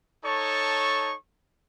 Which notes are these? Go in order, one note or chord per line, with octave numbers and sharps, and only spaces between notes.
D#4 A4 C#5 A5 C#6